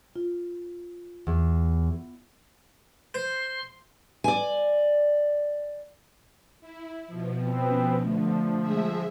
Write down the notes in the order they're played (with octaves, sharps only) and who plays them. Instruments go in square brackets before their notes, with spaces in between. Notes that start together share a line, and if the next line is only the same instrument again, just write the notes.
[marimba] F4
[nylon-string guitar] E2
[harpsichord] C5 [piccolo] C6
[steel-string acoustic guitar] D5 G#5
[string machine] E4
B2 F3
[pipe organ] B3 C4
[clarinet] C#4
[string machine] D3 [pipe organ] F3 [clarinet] A3
[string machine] G#3 G#4 E5